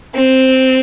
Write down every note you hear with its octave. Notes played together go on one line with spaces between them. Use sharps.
C4